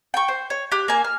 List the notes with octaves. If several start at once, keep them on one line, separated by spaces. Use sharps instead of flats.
G5 C#6
C5
C#5
G4 F#6
A#3 G#5
F6